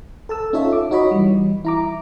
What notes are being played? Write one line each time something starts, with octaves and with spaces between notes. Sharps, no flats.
A4 A5 E6
C#4 D#4 F4 A4 C#5 E5
D6
D#4 F#4 C#5 D#5 B5
E3 G3
E4 A#5 D6